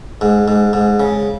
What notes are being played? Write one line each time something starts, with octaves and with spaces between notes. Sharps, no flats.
G#2
G#2
G#2
C#3